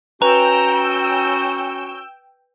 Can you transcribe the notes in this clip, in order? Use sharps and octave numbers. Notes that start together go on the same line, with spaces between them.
C#4 F#4 B4 G5 A#5 E6